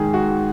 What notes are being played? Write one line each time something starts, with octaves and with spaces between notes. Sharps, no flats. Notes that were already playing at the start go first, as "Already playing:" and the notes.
Already playing: G#2 D#3 G#4
F#4